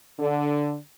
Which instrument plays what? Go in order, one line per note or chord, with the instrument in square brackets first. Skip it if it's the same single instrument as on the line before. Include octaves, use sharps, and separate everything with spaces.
[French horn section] D3